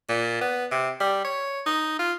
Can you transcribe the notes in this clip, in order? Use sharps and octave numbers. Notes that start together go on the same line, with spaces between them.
A#2
B3
C3
G3
C#5
D#4
F4